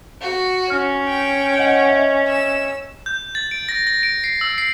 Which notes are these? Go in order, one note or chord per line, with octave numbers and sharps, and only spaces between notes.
F#4
C#4 F6
G5
D#5 F#5 F#7
D#5 E5
E6
G6
A6
D7
A#6
A#6
D7
C7
E6
C7